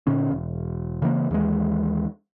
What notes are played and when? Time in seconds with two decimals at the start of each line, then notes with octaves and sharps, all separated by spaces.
0.07 A#2 D3 C#4
0.32 E1
1.02 C#3 E3 A3 A#3
1.31 D#2 E3 G3 G#3